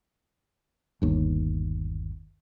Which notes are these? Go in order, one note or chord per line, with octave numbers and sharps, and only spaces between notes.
G1 D#2